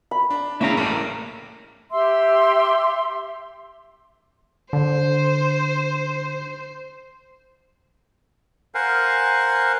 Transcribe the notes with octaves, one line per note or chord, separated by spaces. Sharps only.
B5
D4
C#3 A#3 C#4 E4 E5 G5 A#5
A1 A2 G3 A#4
G4 E5 C6 E6
D3 C5
A#4 C5 F5 F#5 G#5